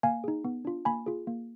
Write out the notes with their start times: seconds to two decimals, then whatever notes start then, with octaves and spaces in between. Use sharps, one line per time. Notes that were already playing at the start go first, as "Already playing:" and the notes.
0.03 A#3 F5 G#5
0.24 D#4 G#4
0.44 B3
0.65 D4 F4
0.85 A#3 G#5 B5
1.06 F4 G#4
1.27 A#3